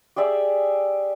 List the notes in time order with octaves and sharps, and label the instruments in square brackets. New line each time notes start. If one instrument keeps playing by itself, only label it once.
[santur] G4 G#4 D5 E5